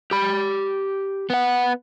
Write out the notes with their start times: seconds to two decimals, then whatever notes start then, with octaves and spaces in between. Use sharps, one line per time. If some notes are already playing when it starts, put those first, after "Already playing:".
0.11 G4 B5
1.30 B3 F#5